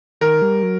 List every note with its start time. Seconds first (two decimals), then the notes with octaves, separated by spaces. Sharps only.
0.21 D#3 A#4
0.42 G3
0.63 F#3